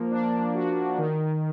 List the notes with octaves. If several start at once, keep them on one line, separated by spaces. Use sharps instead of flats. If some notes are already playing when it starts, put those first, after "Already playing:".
Already playing: F3 A#3
D4
F#4
D#3